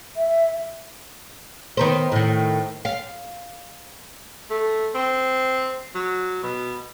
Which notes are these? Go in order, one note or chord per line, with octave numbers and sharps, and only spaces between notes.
E5
D#3 B3 C5
A2 D#3
F5
A3
C4
F#3
B2